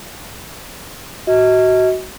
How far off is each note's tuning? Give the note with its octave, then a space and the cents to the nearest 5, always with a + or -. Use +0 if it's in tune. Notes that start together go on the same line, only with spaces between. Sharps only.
F#4 +15 D#5 +40